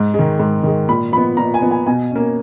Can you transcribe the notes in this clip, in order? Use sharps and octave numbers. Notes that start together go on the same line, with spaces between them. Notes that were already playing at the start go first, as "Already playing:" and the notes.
Already playing: G#2
D#3 G#3
G#2
D#3 G#3
A#2 B5
F3 B3 B5
A#2 A#5
G#5
F3 B3
G#5
B2 G#5
A#3 C#4